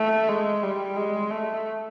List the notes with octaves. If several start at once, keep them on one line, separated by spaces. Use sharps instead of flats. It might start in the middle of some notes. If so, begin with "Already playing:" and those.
Already playing: A3
G#3
G3
G#3
A3